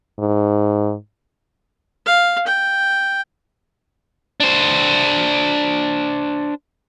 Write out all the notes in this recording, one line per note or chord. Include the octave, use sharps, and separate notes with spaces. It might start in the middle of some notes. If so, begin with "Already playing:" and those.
G#2
F5
G5
D4 C5